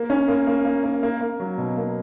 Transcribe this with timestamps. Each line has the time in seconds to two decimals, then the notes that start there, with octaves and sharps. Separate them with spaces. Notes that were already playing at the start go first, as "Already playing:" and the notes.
Already playing: A#3
0.10 C#4
0.28 A#3
0.47 A#3
0.65 A#3
0.84 A#3
1.03 A#3
1.21 A#3
1.40 F#3
1.58 B2
1.77 A#3